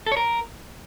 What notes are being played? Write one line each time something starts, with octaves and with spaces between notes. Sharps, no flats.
A4
C#5
A#4